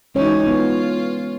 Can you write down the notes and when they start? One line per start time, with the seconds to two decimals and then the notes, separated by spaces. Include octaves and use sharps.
0.15 E3 G#3 C#4 D#4 F#4 C#5
0.47 B3 F4